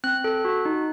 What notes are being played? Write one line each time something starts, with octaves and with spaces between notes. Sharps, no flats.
C4 F#6
A4
F#4
D#4